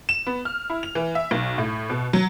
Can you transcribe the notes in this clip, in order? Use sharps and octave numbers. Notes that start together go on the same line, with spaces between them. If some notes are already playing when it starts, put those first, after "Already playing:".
E7
B3
F6
E4
F7
E3
E5
B1
A2
B2
F#3